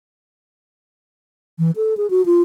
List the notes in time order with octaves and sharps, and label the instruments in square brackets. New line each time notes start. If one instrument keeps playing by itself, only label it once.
[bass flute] E3
A4
G#4
F#4
F4